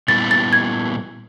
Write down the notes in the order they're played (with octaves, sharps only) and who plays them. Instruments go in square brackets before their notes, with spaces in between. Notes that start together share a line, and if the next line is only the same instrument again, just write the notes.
[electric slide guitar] A#2 G3 B3 E4 [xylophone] A6
[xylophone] A6
G#6